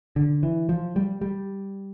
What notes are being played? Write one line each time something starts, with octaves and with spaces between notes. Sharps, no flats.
D3
E3
F3
G3
G3